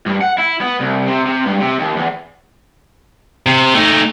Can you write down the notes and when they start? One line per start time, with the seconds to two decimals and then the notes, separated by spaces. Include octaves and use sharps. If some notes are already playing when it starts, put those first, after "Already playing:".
0.06 G2
0.21 F#5
0.38 E4
0.61 B3
0.81 C2
1.08 C3
1.26 C3
1.45 G2
1.60 C3
1.78 D#2
1.96 E2
3.46 C3
3.74 A3 D#4